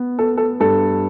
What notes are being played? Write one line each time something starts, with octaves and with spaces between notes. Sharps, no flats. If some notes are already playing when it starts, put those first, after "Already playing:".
Already playing: B3
B3 A4
A4
G2 A4